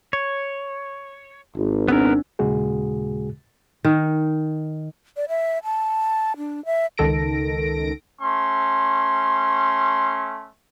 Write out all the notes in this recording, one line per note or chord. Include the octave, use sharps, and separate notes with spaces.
C#5
G#1
B3 C4 D4 A#4
D#2 A#2 C#3 G#3 F#4 G#4
D#3
D5
E5
A5
D4
E5
C#2 D#3 A4 A#6 D7
A3 C#4 C6